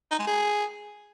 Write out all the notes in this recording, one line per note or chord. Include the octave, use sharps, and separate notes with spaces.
D#4
G#3
G#4